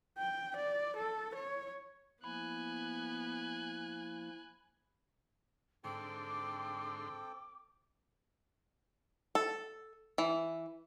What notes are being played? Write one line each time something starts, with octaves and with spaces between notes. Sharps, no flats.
G5
D5
A4
C#5
F3 A#3 B3 E4 G#5 B5 F#6
G#2 D3 C4 A4 G5 C6 D6
A4
E3